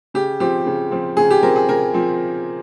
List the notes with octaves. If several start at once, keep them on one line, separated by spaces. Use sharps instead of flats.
C#3 G4
F3 C4 G4
C#3
F3 C4
C#3 G#4
G4
F3 C4 A#4
G#4
C#3 A#4
F3 C4